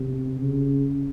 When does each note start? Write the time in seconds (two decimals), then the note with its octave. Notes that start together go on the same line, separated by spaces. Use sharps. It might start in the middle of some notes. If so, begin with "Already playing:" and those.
Already playing: C3
0.37 C#3